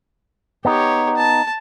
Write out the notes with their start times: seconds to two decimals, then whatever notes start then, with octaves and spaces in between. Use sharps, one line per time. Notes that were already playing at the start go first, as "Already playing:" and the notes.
0.65 B3 D#4 G4 C#5
1.16 A5